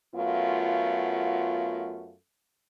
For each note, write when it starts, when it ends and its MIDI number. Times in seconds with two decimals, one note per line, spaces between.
0.15 2.13 42
0.15 2.13 57
0.15 2.13 59
0.15 2.13 65